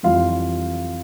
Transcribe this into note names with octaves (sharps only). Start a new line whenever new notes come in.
F2 E3 G3 F4 F5